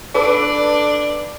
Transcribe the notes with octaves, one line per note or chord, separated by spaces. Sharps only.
D4 A4 B4 D6